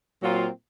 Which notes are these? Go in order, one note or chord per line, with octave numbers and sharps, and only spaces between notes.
A#2 F#3 C4 F4